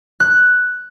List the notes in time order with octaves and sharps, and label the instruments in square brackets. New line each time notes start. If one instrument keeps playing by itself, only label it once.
[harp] F#6